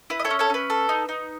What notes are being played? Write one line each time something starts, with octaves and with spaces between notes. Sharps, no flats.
E4 B4
D#5
A4 C#5
C#4
A4 C#5
C#4 B4
A4
D#4
D#4